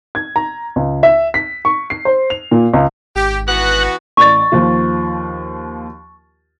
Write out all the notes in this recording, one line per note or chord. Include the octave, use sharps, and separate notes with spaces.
G#6
A#5
C#2
E5
B6
C#6
C7
C5
F7
A#2
C#2
G#1 G4
E3 B3 F#4 F#6
A1 D5 C#6 A6
D#2 F3 F4